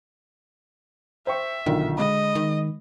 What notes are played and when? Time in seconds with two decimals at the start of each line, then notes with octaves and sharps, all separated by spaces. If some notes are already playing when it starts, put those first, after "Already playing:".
1.27 C5 E5 G5 C#6
1.66 B1 A#2 D3 D#3
1.98 G#3 D#5 B5
2.35 D#3